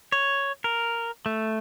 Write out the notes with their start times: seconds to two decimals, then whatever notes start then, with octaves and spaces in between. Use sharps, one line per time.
0.12 C#5
0.64 A#4
1.26 A3